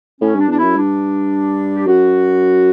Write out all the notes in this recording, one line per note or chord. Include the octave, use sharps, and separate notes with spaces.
A2 C#4
G2 D4
E2 D4
E4
F#2
G2 D4
G4
F#2 F#4